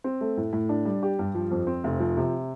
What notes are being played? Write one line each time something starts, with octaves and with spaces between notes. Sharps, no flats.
C4
A3
A2
A2
D4
G3
G4
G2
F3
F2
C4
F1
F3
C3